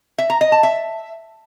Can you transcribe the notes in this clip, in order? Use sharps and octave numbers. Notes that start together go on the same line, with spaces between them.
E5
A#5
D#5
A5
E5